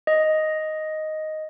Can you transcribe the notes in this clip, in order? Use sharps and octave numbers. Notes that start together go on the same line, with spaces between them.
D#5